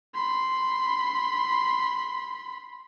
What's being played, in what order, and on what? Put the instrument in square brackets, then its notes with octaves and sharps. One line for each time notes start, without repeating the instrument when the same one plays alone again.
[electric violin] B5 C6